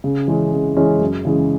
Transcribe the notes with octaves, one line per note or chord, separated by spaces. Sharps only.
C#3
E3 G#3 C#4
C#3
E3 G#3 C#4
F#2
C#3 E3 G#3